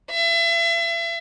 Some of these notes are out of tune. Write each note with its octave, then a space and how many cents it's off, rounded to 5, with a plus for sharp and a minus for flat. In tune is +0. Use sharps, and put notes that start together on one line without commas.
E5 +35